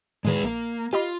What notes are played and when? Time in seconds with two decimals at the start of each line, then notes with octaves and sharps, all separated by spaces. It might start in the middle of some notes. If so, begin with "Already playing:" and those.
0.25 A2 D#3 G#3 G#4 B4
0.43 A#1 A#3
0.93 F4 G4 D#5 B5